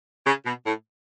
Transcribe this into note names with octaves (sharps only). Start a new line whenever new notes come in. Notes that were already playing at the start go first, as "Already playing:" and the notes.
C#3
B2
A2